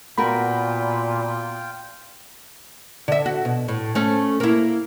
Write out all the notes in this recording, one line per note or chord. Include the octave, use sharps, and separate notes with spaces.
A#2 B3 F4 F#4 A#4 G5 B5
D3 E5
F#4
B2
A2
A3 C#4
A#3 E4